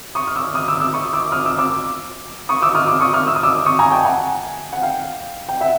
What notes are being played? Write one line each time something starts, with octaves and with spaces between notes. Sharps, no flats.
C#6 D#6
F6
D6 E6
D#6 F6
D6 E6
D6 E6
C#6 D#6
D6 E6
D#6 F6
D6 E6
D6 E6
C#6 D#6
D6 E6
D#6 F6
D6 E6
C#6 D#6
D#6 F6
E6
D#6
D6 E6
C#6 D#6
G#5 A#5
G5 A5
F#5 G#5
F#5
F5 G5
G5
E5 F#5